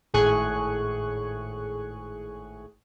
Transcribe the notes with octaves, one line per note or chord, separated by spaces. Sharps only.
G#1 A2 G#4 G#5 C#6 F#6